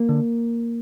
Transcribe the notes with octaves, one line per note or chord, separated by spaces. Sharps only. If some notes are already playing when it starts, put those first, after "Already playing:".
Already playing: A#3
D3